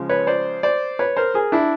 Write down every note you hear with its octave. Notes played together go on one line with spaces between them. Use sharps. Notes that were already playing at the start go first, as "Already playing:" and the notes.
Already playing: C#3 F3 G#3
B4 C#5
C5 D5
C5 D5
B4 C#5
A#4 C5
G#4 A#4
D4 E4